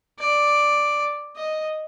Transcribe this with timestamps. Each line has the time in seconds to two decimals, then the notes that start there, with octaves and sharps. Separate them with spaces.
0.19 D5
1.36 D#5